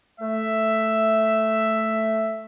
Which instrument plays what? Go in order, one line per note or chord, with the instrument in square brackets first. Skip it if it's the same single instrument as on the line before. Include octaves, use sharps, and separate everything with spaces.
[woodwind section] A3 [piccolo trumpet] E5